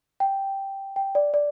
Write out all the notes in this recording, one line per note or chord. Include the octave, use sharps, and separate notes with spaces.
G5
G5
D5
D5